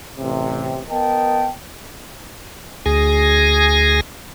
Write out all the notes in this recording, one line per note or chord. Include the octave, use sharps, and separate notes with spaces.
A1 C3
B3 A#4 D#5 G5 A5
D2 G#4 G#5 A#6